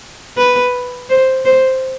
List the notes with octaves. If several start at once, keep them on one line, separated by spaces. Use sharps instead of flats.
B4
C5
C5